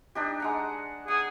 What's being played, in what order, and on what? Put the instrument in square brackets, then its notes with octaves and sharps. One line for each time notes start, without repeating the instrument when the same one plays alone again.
[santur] D4 D#4 G4
G#3 F#5 A#5
[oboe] G#4 [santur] F#5